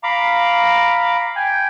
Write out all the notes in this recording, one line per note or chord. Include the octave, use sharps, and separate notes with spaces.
F5 A#5 B5 D6
G5 G#5